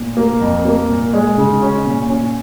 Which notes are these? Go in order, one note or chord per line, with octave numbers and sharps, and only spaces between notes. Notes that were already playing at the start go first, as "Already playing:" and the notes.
Already playing: A#2
A#3
F2
A#3
A#2
G#3
C#3
C#4
A#2
C#4